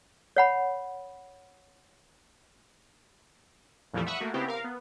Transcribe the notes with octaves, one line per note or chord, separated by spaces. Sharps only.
C#5 F#5 B5
F2 A#2 E3 F3 G3 A3
E5 F#5 B5 C#6 D#6
A3 A#3 F#4
C#3 B3 C4 E4 G4
A#4 F5
B3